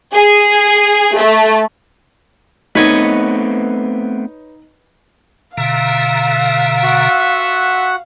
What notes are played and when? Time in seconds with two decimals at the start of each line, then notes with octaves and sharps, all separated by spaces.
0.13 G#4
1.16 A3
2.75 A3 B3 C4 D#4 B4 C#5 D#5
5.57 B2 D3 F4 A4 E5 F5 A#5
6.83 F#4 F#5